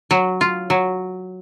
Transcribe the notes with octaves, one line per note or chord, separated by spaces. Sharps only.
F#3
F4
F#3